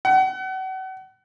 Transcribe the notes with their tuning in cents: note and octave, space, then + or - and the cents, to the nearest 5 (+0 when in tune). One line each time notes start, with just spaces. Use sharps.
F#5 +35